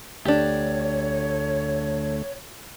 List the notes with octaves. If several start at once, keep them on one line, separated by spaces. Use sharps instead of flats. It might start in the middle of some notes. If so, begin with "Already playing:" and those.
D2 A3 D4 G4 C#5